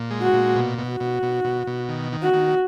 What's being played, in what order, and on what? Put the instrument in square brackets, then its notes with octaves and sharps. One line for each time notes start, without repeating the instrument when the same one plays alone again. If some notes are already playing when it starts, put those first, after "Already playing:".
Already playing: [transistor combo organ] A#2
G#3
[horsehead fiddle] F#4
[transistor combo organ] A#2
B2
B2
[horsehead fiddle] F#4
[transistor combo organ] B2
B2
B2
B2
D#3
D#3
[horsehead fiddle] F#4
[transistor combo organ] D#3